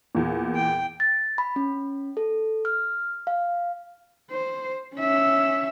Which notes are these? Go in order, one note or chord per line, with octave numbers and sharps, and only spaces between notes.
E2 A#2
G5
A6
B5
C#4
A4
F6
F5
C5
C#4 E5